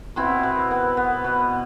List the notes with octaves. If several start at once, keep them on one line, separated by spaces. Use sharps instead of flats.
B2 C4 E4
B2
B3
B3
B2